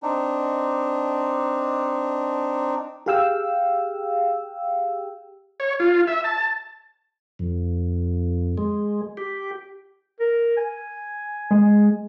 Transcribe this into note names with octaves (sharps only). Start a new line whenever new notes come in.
C4 D4 D#4
G4 G#4 F5 G5 E6
C#5
F4
E5
A5
F2
G#3
G4
A#4
G#5
G#3